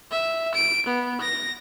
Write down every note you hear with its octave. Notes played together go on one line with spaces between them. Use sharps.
E5
D7
B3
A#6